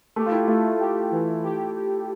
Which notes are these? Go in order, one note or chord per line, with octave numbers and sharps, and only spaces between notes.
A3 G4
F4
E4
A3 F4
G4
E3
G4
G4